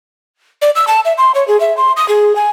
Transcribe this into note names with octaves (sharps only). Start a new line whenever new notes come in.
D5
E6
A5
E5
C6
C#5
G#4
E5
C6
D#6
G#4
G#5